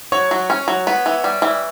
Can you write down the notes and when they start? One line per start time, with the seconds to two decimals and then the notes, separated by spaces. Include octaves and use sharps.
0.12 F#3 C#5 C#6
0.31 F#3
0.50 C#4
0.68 F#3
0.87 B3
1.06 E3
1.24 G3
1.42 E3